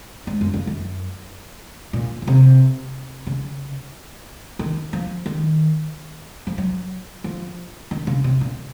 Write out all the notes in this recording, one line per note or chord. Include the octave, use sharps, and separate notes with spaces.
G#2
F#2
F2
F#2
A#2
C#3
C3
C#3
D#3
F3
D#3
F3
F#3
F3
D#3
C#3
C3
A#2